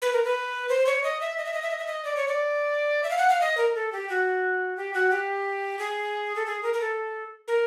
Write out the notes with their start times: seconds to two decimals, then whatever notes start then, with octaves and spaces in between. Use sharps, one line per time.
0.02 B4
0.13 A#4
0.24 B4
0.69 C5
0.86 C#5
1.03 D#5
1.21 E5
1.38 D#5
1.45 E5
1.53 D#5
1.62 E5
1.70 D#5
1.78 E5
1.87 D#5
2.05 D5
2.16 C#5
2.28 D5
3.03 E5
3.10 F5
3.18 F#5
3.29 F5
3.41 D#5
3.57 A#4
3.75 A4
3.92 G4
4.09 F#4
4.77 G4
4.94 F#4
5.11 G4
5.79 G#4
6.36 A4
6.46 G#4
6.63 A#4
6.73 A#4
6.81 A4
7.48 A#4